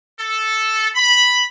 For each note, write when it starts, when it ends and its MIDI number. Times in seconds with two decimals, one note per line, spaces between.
0.19 0.88 69
0.95 1.43 83